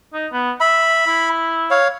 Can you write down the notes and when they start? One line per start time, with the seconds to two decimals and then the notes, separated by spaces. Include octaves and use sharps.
0.13 D#4
0.32 B3
0.60 E5 B5
1.06 E4
1.71 C#5 F5